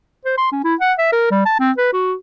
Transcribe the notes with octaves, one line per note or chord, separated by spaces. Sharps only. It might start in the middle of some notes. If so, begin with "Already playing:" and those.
C5
C6
C#4
E4
F#5
E5
A#4
G3
A5
C4
B4
F#4